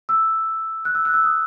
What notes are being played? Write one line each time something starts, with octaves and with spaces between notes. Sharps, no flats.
E6
F#6
E6
F#6
E6
D#6